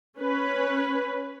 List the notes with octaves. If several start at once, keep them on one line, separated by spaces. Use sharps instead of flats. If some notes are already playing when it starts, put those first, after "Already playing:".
C#4 B4